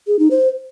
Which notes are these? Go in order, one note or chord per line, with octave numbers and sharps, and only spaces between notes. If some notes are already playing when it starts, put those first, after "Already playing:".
G#4
D#4
C5